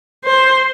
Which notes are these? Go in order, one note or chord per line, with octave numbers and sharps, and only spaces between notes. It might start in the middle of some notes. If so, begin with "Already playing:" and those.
C5